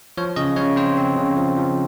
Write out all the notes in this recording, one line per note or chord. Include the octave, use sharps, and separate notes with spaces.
F3 C#5
C#3 D#5
C#3 C#5
C4 C5
C4
C#3
F3
F3